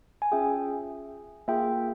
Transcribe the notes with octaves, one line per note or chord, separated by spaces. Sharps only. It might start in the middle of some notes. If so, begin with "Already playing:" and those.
G#5
C#4 F4 G#4 E5 G5
A#3 F4 G#4 E5 G5